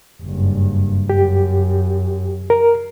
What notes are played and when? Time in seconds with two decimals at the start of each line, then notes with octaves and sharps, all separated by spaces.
0.23 F#1 G2
1.10 F#2 G4
2.50 A#4